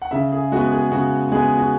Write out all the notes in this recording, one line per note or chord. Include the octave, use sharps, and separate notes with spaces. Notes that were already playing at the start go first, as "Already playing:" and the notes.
F#5
C#3 E5
G#4
G#3 B3 F#4
G#4
C#3 F#4
G#3 B3 G#4
F#4